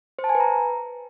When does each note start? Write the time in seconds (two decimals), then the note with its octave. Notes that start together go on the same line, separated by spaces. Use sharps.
0.19 C5
0.24 A5
0.29 G#5
0.35 B4
0.40 A#5